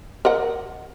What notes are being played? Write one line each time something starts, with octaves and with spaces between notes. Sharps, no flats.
A#4 D#5 F#5